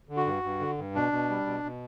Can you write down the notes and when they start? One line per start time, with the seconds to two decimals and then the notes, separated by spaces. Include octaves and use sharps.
0.09 D3
0.17 F#4
0.26 G2
0.43 G2
0.60 D3
0.78 G2
0.95 B2 D4
1.12 B2
1.29 G3
1.46 B2
1.64 B2